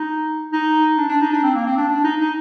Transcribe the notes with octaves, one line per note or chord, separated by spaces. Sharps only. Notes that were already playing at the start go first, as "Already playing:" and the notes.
Already playing: D#4
D#4
D4
D4
D#4
D4
C4
A#3
C4
D4
D4
D#4
D#4